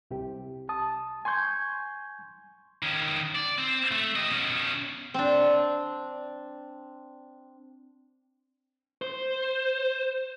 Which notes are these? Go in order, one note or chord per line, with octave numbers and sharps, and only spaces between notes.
C2 C3 G4
A5 D#6
G#5 C6 C#6 G6 G#6
D#3 C#4
D5
C4
A3
G4 D#5
B2 C#4
C4 D4
C5